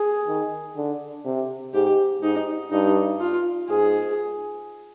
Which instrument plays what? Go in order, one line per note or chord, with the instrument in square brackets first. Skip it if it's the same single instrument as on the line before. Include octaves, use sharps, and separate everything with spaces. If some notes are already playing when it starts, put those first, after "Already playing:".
Already playing: [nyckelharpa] G#4
[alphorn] D#3
D3
C3
[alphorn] G#2 [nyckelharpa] G4
[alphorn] G#2 [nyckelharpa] D#4
[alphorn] G2 [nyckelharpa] D#4
[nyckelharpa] F4
[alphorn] G#2 [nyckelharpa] G#4